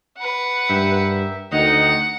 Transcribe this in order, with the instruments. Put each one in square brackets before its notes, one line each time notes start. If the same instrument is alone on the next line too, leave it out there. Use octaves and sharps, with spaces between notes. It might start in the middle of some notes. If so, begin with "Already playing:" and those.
[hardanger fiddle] B4 F#5
[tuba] G2 [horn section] G4 A#4 E5
[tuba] D2 [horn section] D#3 D#4 [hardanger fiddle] F#5